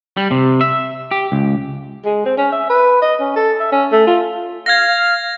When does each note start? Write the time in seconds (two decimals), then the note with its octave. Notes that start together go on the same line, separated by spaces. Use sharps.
0.17 G3
0.31 C3
0.61 E5
1.11 G4
1.32 C#2
2.05 G#3
2.26 C4
2.37 C#4
2.52 E5
2.70 B4
3.02 D#5
3.20 C#4
3.36 A4
3.60 E5
3.72 C#4
3.92 A3
4.07 F4
4.66 F5 G#6 A#6